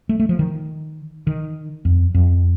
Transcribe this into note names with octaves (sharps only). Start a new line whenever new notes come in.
A3
A3
F3
D#3
D#3
F2
F2